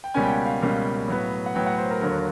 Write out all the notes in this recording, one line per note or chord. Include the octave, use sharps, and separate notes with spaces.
G5
C#2 B2 G3 A#3 C#4 G#5
G5
F#5
F5
C#2 B2 G3 A#3 C#4 F5
A2 F#3 B3
F#5
A2 F#3 B3 G5
F#5
C5
A#4
D#2 D3 F#3 A#3 A#4